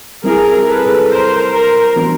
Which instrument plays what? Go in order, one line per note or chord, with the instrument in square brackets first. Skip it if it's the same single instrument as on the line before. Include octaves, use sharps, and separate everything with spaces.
[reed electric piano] G3 C4 E4 [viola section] G#4 A#4
[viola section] A4 B4
A#4 C5
A#4 C5
[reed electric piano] E3 G3 B3 D4 F#4